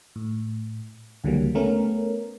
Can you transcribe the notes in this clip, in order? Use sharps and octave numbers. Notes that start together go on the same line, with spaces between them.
A2
C#2 D3 E3 F#3 G3 A#3
A3 B3 C#4 A#4